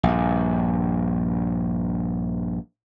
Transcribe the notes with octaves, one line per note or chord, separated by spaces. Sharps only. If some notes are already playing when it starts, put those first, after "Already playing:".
A#1 G2